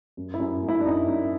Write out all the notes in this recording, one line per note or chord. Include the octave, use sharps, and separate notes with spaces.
F#2
E4
F#2
F#2
E4
D4
F#2 D#4
F#2